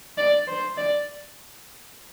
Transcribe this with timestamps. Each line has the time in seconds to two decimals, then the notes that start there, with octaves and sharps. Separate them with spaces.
0.18 D5
0.48 C5
0.77 D5